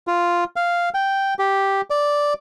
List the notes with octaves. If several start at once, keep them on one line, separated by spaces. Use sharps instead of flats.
F4
F5
G5
G4
D5